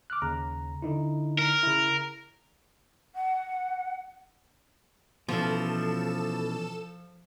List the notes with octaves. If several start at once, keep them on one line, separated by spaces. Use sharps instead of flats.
D6 F6 F#6
D#2 C#3 A#5
D3 D#4 E4
A#4
C#3 E4
F#5
B2 E3 F3 C#4 A4 E7